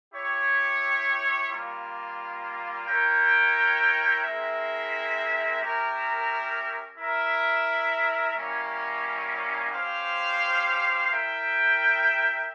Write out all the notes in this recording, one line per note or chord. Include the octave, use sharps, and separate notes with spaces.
E4 G4 C#5
G3 A#3 F4
E4 A#4 C#5 G5
G#3 C4 E4 A#4 E5
C#4 G4 A#4 E5
E4 A#4 E5
G3 A#3 C#4 E4
C#4 G4 C5 F5
E4 A#4 E5 G5